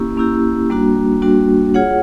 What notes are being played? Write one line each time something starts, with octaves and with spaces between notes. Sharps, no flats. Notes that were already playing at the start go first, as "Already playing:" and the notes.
Already playing: A#3 C#4 E4 G4
A#3 C#4 E4 G4
G3 A#3 D4 F#4
G3 A#3 D4 F#4
F4 G#4 C#5 F#5